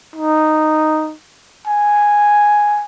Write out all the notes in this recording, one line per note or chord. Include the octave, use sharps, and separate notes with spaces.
D#4
G#5